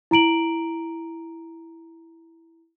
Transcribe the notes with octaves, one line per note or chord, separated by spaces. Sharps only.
E4 A#5 D7 F#7